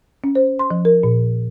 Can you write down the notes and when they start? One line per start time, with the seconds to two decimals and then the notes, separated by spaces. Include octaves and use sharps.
0.24 C#4
0.35 C5
0.59 C6
0.71 F3
0.85 A#4
1.03 A#2